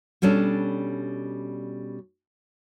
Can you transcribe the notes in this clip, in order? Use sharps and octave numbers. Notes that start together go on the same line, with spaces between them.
B2 G3 C#4 D4 A4